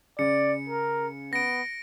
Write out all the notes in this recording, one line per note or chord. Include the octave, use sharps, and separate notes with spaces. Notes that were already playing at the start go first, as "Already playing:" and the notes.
C#3 D5 C#7
A#4
B3 A#6 D7